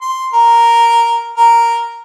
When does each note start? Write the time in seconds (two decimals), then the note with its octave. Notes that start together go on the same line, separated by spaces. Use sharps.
0.01 C6
0.33 A#4
1.37 A#4